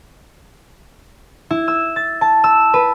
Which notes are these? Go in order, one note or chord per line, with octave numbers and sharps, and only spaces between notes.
E4
E6
A6
A5
E6
B4